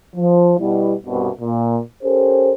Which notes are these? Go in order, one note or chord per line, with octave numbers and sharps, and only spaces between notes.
F3
B2 G3 E4
C2 G2 B2
A#2
C#4 G4 A4 A#4 C5